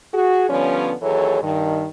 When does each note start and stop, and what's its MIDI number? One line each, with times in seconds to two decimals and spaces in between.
0.14 0.48 66
0.14 0.48 68
0.49 0.92 50
0.49 0.92 53
0.49 0.92 55
0.49 0.92 59
0.49 0.92 61
1.02 1.40 39
1.02 1.40 52
1.02 1.40 54
1.02 1.40 68
1.02 1.40 69
1.02 1.40 73
1.42 1.85 43
1.42 1.85 51